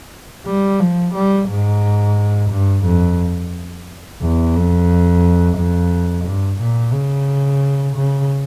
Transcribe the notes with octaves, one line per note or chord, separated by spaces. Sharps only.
G3
F3
G3
G#2
G2
F2
E2
F2
F2
G2
A#2
C#3
C#3